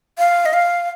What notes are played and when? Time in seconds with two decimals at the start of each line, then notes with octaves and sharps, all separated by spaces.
0.18 F5
0.46 D#5
0.53 F5